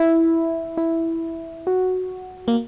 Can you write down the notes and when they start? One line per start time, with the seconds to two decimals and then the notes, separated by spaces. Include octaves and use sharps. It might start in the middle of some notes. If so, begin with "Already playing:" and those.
Already playing: E4
0.77 E4
1.67 F#4
2.48 A#3